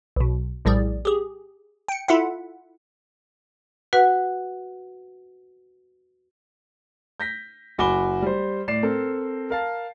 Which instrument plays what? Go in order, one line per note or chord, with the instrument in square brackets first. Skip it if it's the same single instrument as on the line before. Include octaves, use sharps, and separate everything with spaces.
[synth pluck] B1 B2
A#1 A2 G3 G#4 D5
G4 G#4
G5 C#7
E4 F4 A4 E5 F#5
[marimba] F#4 B4 F#5
[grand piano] G6 A#6 B6
F#1 F#4 G#5 B5 D6 G7
G3 C5
A2 D5 C7 E7
C4 A4 A#4
A#4 F5 A5